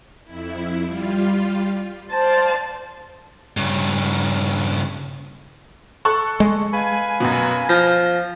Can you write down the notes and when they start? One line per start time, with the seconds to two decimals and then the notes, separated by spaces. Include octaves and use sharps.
0.25 F2 E4
0.84 G3 F4
2.11 C5 D5 F5 A5
3.57 G2 C#3
6.05 A4 C#6 F#6
6.40 G#3
6.73 B4 F5 G#5
7.20 F#2 B2
7.69 F3 A#6